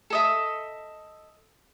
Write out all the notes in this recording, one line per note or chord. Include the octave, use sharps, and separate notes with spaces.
A4 D#5 E5